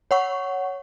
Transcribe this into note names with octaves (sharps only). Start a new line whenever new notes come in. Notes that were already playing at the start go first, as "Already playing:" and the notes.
C#5 F#5 C#6